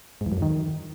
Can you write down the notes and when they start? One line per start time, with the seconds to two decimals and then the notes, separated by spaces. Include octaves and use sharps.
0.21 G#2
0.26 E2
0.32 F#2
0.37 F2
0.42 D#3